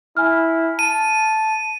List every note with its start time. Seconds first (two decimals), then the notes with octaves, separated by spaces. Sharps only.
0.17 E4 G#5 F6
0.79 A5 D#7